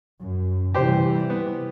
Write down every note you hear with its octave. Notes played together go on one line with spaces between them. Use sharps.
F#2
C3 E3 G3 G4 C5
B3